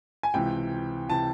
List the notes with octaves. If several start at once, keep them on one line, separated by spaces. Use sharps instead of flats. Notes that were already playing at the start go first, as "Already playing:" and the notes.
G#5
C#2 C3 E3 G5
C3 E3 A5